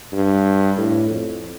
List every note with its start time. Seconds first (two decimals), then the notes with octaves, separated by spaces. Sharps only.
0.13 G2
0.77 A2
1.10 F2